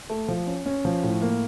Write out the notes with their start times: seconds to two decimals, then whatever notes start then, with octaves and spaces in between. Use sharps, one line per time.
0.10 A3
0.28 F3
0.47 C#4
0.66 C#4
0.85 F3
1.03 A2
1.22 A#3